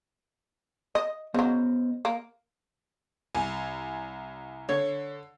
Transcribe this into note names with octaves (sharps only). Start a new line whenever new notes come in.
D#5
C#3 F#3 B3 C5 D#5
A#3
C2 G#5
D3 C#5